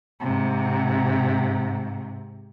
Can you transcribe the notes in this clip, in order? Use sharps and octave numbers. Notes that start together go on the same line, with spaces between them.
G#2 C3